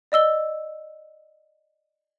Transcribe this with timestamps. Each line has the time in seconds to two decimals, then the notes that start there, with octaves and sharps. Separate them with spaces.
0.12 D5 D#5 E6 G7